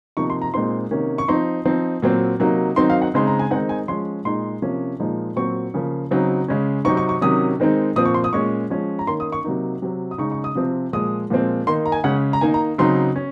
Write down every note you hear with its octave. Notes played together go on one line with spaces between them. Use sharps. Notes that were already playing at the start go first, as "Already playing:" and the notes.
C3 F3 A#3 D#4 C#6
C6
A#5
A#2 G#3 C4 D#4 C6
C3 D#3 A#3 C#4
C#6
F3 C4 D#4 C6
F3 C4 D#4
A#2 F#3 C4
C3 F#3 A#3 D#4
D#3 F#3 C4 D#4 C6
F5
F#5
C#3 G#3 C4 D#4 C6
A#5
G#5
D#3 G#3 C4 D#4 F#5
G#5
F3 G#3 C#4 C6
A#2 G#3 D#4 C6
C3 F3 A#3 C#4
A#2 F3 G#3 D#4
A#2 F#3 C4 C#6
C#3 F3 A#3
C#3 F#3 C4 D#4
C#3 G#3 C#4
C3 F#3 C4 D#4 C#6
C#6
C#6
C3 D#3 F#3 C#4 D#6
D#3 G#3 C4 D#4
A#2 F3 C4 D#6
C#6
C6
D#6
A#2 G#3 C#4 C#6
F3 G#3 C#4
A#5
D#3 A#3 C#4 C6
D#6
C#6
C3 F#3 A#3 D#4
C3 F#3 C4
D#6
C#3 G#3 D#4 C#6
C#6
D#6
C3 F3 C4
A#2 F3 G#3 D#6
A#2 F3 G#3 C4
D#3 A#3 D#4 C6
A#5
G#5
C#3 G#3 C#4 F#5
A#5
D#3 A#3 D#4 G#5
A#5
C#3 F#3 C4 D#4 C6
C#4